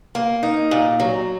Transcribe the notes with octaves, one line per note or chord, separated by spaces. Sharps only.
A#3
D#4
A#2
F#3